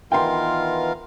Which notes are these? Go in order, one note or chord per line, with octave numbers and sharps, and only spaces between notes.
D#3 E3 B3 F4 A#4 F5 G5 C6